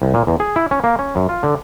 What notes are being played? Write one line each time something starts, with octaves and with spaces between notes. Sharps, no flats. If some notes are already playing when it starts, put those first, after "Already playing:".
C2
A#2
E2
G#4
E4
C#4
A#3
C#4
F#2
F4
D3